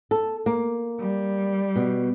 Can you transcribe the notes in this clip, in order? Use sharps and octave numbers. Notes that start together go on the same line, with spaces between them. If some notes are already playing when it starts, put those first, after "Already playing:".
A4
A#3
G3
B2